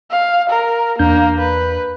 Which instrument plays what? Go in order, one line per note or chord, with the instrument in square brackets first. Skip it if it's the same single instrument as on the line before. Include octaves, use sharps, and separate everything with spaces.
[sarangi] F5
A#4
[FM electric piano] E2 D4 G6 [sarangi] A#3
[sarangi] B4